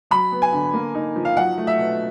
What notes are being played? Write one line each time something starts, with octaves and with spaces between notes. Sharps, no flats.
F#3 B5
B3
G#5
D3
A#3
D#4
F3
F5
F#3 F#5
A3
E5
B2